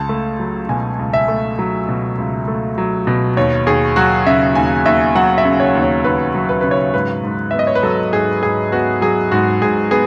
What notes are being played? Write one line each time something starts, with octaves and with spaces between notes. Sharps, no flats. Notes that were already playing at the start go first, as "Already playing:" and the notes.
Already playing: C#2 A5
A3
F#3
B2 G#5
C#2
E5
A3
F#3
B2
C#2
A3
F#3
B2
D#2 C#5
D#2 G#4
F#3 F#4
C#3 E5
D#2 G#5
D#2 E5
F#3 F#5
E5
C#3
C#5
D#2
C#5
D#2 B4
F#3
B4
C#3 B4
C#5
G#2 B4
G#2
B3 E5
D#5
C#5
B4
F#3 A4
G#2 G#4
G#2 G#4
B3 F#4
F#3 G#4
G#2 F#4
G#2 G#4
B3 G#4